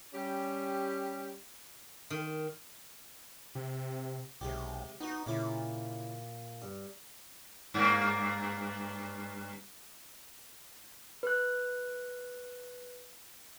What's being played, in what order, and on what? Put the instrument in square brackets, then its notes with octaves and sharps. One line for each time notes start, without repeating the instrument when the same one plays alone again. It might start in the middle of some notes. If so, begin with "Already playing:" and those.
[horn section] G3 C#4 G4
[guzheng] D#3
[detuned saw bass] C3
[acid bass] B1 [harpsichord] C3 G#3 G4
[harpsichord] B3 F#4 [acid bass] D#4
[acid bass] A#2 [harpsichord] C#3 E4 D6
[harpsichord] G2
[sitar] G2 A#3
[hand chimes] B4 F#6